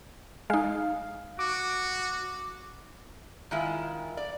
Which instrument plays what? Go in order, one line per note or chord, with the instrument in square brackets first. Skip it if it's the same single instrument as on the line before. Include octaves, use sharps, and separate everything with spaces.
[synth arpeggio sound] G#3 D#4 [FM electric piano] F5
[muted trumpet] F#4 [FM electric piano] D6
[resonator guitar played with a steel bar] D#3 G#3 E4 F4
D5